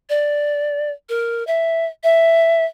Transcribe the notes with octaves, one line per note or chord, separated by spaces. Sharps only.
D5
A#4
E5
E5